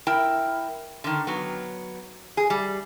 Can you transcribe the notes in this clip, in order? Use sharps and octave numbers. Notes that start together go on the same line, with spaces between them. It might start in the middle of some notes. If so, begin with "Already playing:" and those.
E4 A#4 G5
D3 D#3
F#3 B3
G#4
G3